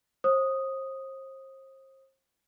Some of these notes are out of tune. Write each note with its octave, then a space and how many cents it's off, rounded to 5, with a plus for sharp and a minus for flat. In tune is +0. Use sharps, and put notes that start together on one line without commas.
C5 +35 D#6 +0